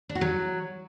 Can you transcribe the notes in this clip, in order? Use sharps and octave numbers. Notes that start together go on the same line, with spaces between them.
D4
F#4
F#3